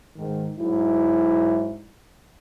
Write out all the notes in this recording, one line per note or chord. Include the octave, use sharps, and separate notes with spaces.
G#2 D#3
G#2 F#3 E4